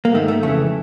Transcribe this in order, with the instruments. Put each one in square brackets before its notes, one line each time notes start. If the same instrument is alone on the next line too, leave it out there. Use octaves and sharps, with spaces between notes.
[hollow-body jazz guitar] A#3
G#2 D#3 A3
A3
F2 C#3 E3 A3